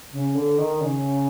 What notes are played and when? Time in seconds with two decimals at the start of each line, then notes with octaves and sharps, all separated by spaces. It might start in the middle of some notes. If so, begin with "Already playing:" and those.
0.12 C#3
0.35 D3
0.58 D#3
0.81 C#3